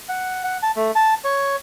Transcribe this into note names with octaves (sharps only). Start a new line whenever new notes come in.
F#5
F#5
A5
A3
A5
C#5